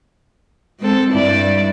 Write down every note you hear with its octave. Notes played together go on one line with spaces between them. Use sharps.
G#3 C4 A4
G2 E4 D5